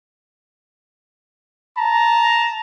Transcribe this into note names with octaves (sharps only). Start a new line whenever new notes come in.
A5 A#5